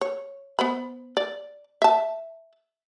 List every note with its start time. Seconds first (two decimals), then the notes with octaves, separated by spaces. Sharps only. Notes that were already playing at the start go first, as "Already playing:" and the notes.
0.01 C#5
0.59 B3 C5 B5
1.17 D5
1.82 E5 A5